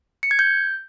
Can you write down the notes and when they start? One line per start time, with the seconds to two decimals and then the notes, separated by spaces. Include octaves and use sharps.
0.23 C#7
0.31 G#6
0.39 G6